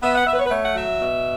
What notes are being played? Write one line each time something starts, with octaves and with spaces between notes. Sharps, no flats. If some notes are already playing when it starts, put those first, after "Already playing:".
B3 E5
F#5
B3 E5
B4
C#5
B4
A3 C#5
F#5
F#3 E5
B2